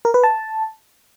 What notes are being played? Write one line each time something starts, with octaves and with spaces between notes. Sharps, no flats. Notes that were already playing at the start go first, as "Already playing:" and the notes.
A#4
B4
A5